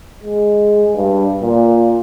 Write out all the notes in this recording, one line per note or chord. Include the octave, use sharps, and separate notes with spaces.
G#3
G2
A#2